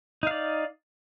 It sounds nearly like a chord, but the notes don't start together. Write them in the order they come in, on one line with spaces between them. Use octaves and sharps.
D#4 F5 D5